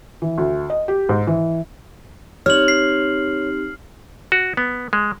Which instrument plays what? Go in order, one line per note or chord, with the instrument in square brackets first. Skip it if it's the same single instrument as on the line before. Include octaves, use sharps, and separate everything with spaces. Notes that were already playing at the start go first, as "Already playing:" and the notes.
[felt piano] E3
D2
D#5
G4
G#2
E3
[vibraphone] C4 D#4 G4 [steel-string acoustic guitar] C#5 [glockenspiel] F6 F#7
[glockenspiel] C7
[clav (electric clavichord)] F#4
B3
G#3